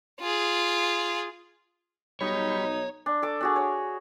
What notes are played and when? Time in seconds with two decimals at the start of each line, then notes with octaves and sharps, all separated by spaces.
0.20 F4 G#4
2.21 B1 G3 D#4 C#5 B5
3.06 D4
3.22 A4 D6
3.41 D4 F#4 G#4
3.56 C#5